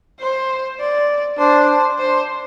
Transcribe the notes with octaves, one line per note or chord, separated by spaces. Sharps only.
C5
D5
D4 C5
C5